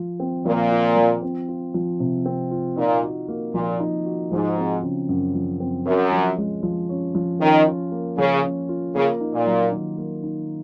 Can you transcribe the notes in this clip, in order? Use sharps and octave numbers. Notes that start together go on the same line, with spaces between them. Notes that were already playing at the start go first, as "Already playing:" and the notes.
Already playing: F3 F4
C4
A#2 F3
F4
F3
C4
F4
F3
C3
C4
F4
A#2 D#4
F#4
A#3
A#2 F3
D#4
F#4
G#2 F3
C4
C#3
F#2
F3
C4
F#2 C#4
F3
G#3
F3
C#4
F3
D#3 C#4
F4
A#3
C#3 F3
C#4
F4
C#3 A#3
D#4
A#2
F#3
D#3
A#3
D#4